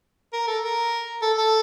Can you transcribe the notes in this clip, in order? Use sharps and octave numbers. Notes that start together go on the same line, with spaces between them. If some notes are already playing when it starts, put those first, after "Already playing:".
A#4
A4
A#4
A4
A4